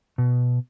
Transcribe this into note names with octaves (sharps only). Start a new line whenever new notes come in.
B2